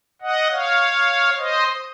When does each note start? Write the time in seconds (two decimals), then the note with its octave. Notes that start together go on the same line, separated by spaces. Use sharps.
0.22 D#5 F#5
0.51 C#5 F5
1.38 C5 D#5